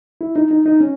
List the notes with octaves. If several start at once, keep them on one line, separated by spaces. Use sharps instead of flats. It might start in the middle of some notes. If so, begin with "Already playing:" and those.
E4
D#4
D#4
D#4
C#4